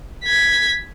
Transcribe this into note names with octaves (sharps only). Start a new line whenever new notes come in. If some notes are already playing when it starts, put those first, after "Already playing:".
G#6 B6